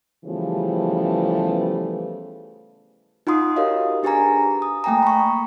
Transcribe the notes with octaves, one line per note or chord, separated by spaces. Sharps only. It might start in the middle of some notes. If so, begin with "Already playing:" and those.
C#3 E3 F3 G3 A3 B3
D#4 F4 F#5 C6 D#6
F#4 G4 A#4 C#5 D#5 F5
D4 G4 G#4 B4 G#5 A#5
D#6
A3 A#3 G5 G#5 A#5
B5 C#6